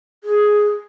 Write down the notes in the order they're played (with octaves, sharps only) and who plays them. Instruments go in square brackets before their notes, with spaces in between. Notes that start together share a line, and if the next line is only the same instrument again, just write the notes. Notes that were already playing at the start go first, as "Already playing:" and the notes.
[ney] G#4